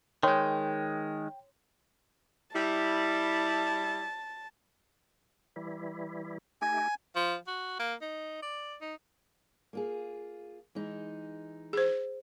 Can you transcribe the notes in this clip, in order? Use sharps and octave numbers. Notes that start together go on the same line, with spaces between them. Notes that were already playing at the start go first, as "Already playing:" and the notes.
D#3 G#3 C#5 G5 C6
G3 E4 A5
E3 G3 E4
A3 D#4 G4 G#5
F3
F#4
A#3
D#4
D5
D#4
A#3 F4 G#4
E3 G#3 D#4
G#4 C5